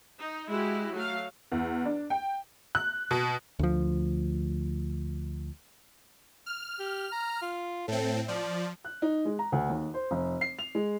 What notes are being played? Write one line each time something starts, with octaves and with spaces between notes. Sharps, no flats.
D#4
G#3 E4 F#4 G4
F#3 A3 F5
E2
D4
G5
F#6
B2
D2 F3
F6
G4
A#5
F4
A2 C4 A4
F3 D5
F#6
D#4
G#3
A#5
D2
D#2
C5
F1
C7
F7
G#3